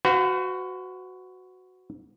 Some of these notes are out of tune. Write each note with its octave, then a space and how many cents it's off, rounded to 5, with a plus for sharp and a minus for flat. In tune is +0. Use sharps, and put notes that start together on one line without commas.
F#4 +0 B4 +40 F5 +30